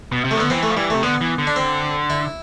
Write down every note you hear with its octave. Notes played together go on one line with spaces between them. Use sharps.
B2
C3
A3
D3 B3
E3 C4
A3
F3
E3 G3
C3 A3
D3 B3
E3
D3
D4
C4
E4